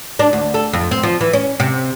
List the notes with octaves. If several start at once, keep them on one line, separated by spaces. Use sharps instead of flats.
D4
D2
A4
F2
C4
F3
E3
C#4
C3